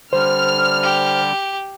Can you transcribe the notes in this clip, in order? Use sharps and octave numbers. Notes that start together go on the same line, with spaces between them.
D3 G3 C5 F6
G4